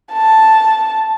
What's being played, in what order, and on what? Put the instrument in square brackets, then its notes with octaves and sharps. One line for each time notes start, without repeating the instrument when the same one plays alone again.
[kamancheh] A5